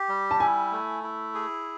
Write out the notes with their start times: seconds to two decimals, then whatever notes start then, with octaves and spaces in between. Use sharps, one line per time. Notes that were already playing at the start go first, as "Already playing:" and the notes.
Already playing: G4
0.08 G3
0.31 A5
0.40 E4 G#5
0.72 A3
1.03 E4
1.35 G#4